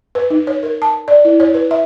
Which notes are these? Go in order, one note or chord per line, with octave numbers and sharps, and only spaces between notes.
B4
D#4
C#5
A#4
A5
D5
E4
C#5
B4
E5